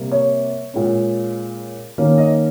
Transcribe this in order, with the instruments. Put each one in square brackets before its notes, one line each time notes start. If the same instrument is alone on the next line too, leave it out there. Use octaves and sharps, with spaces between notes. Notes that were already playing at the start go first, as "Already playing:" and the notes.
Already playing: [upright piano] C3 G3 A#3
C#5
A#2 G#3 C#4
D#3 A#3 C#4
D#5